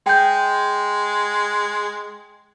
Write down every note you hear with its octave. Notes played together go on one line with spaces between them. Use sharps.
G#3 G5 G6